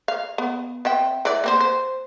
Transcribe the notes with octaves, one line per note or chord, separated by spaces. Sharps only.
F5
B3
C4 E5 G5
E3 D5
A#3 C4 C5
C5